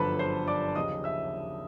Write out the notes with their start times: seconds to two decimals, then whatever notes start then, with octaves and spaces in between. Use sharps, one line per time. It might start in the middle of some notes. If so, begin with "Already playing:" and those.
Already playing: G1 F#2 D3 F3 A4 B4 A5 B5
0.19 C5 C6
0.48 D5 D6
0.75 D#2 C#3 F3 D#5 D#6
1.04 E5 E6